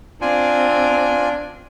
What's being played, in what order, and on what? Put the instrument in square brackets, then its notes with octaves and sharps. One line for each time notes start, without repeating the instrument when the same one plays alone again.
[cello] C4 [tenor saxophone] D4 [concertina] F4 G#5